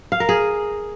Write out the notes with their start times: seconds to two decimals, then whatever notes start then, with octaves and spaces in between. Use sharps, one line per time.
0.12 F5
0.20 A#4
0.29 G#4